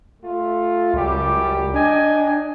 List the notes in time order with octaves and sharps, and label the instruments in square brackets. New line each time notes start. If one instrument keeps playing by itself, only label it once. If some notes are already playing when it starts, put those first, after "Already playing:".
[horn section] A3 F4
[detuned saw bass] C#2 [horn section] F#2 G3 G4
[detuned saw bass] D4 [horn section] D#5 G5 G#5